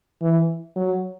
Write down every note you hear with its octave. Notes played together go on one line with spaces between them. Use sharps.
E3
F#3